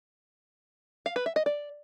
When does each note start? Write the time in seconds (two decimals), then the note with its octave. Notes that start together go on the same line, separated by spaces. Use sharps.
1.06 F5
1.16 B4
1.26 E5
1.36 D#5
1.46 D5